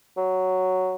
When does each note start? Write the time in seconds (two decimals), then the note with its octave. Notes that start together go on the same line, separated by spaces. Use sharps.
0.17 F#3